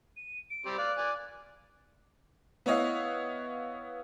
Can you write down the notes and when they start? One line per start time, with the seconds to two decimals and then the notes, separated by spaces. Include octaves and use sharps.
0.17 D#7
0.50 D7
0.66 G3 C4
0.78 D5 F5 F#6
0.97 D5 G#5
2.66 B3 E4 C#5 D#5 F5